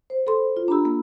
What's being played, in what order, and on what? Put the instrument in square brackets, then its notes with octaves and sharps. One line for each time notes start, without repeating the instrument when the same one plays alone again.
[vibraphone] C5
[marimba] A4 B5 C6
F4
[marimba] D4 G4 [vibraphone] A#5 B5 E6
[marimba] A#3